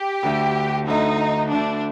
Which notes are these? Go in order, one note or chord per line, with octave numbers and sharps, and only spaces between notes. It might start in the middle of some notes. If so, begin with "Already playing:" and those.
Already playing: G4
D2 D3 A3
D2 D3 A3 D#4
D2 D3 A3 D4